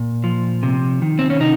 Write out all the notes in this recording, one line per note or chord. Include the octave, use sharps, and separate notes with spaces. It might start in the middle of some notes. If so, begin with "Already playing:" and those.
Already playing: A#2
F3
C3
D#3
C4
C#4
C3 D#4